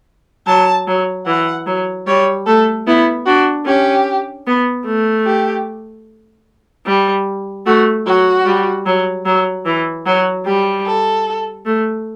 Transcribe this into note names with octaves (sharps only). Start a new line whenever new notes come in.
F#3 A5
F#3
E3 F#5
F#3
G3 C#5
A3 A4
B3 E4
D4 F#4
C#4 G4
B3
A3
G4
G3
A3 F#4
F#3 F#4
G3
F#3
F#3
E3
F#3 F#4
G3 G4
A4
A3